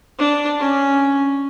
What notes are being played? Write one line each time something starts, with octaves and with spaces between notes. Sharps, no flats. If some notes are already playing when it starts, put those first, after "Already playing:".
D4
C#4